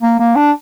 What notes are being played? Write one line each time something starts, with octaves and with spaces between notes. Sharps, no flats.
A#3
A#3
D4